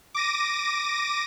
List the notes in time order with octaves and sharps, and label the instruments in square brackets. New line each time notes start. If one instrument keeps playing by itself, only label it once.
[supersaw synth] D6 A#6 D#7